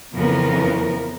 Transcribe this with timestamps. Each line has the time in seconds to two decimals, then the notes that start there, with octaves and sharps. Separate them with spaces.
0.15 F2 C#3 E3 F3 B3 A#4